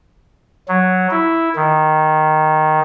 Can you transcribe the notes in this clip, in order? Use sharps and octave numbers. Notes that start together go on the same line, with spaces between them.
F#3
E4
D#3